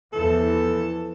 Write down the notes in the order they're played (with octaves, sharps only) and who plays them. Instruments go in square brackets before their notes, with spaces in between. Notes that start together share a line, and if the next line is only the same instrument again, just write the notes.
[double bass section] E2 E3 F3 [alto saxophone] A4